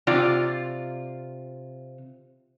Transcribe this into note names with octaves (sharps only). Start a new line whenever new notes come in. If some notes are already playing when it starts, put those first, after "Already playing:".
C3 F4 D5